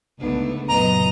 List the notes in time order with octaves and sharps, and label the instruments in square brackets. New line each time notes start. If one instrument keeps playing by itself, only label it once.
[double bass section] C#2 D3 B3 [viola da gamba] A3 D4 D#4
[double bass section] F#1 A#2 B3 [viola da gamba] F#2 F#3 D#5 [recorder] A#5